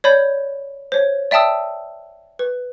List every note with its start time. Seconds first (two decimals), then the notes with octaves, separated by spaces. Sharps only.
0.04 C#5 D5 B5 G6
0.92 C5 C#5
1.31 D5 E5 G5 A5 D#6 E6
2.39 B4